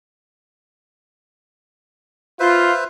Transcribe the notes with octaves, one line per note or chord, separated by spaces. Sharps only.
F4 B4 C5 E5